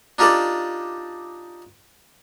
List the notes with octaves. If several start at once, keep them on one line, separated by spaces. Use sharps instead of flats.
D4 D#4 F4 G4 A4 D5